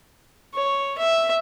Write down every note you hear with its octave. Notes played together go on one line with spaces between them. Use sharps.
C#5
E5